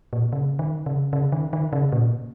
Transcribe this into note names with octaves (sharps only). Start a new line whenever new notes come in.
A#2
C#3
D#3
C#3
C#3
D#3
D#3
C#3
A#2